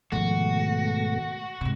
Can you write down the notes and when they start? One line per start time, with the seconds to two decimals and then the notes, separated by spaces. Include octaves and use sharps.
0.12 G#2 B2 D#3 F3 A3 F#4
1.61 G#2 C3